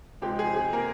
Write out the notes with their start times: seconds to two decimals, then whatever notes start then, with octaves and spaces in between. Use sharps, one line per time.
0.22 C#2 C3 F3 G#3 C4 G4
0.39 G#4
0.56 G#4
0.73 A#3 A#4